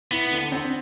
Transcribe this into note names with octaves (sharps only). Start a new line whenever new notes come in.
B3 E4
D3
C4